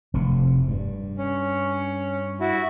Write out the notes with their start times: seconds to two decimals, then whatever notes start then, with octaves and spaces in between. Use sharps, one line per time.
0.14 F1 A2 C3
0.68 G2
1.18 C#4
2.40 E4 F#4